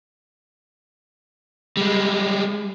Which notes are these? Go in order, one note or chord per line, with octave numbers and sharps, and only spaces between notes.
G3 G#3